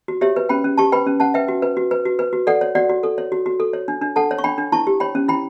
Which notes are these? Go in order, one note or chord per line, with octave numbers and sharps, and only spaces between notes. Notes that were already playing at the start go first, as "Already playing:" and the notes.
F#4
G4 C#5 E5
B4
C#4 G5 B5
C#4
G4 A5 C#6
B4 G5 B5
C#4
C#4 F#5 A5
B4 E5 G5
F#4
B4
F#4
B4
F#4
B4
F#4
A4 D5 F#5
C#5
F#4 D5 F#5
F#4
A4
C#5
F#4
F#4
A4
C#5
D4
D4
A4 F#5 A5
C#5
C#6
D4 G5 B5
D4
E4 A5 C#6
G4
C#5 G5 B5
C#4
E4 G5 B5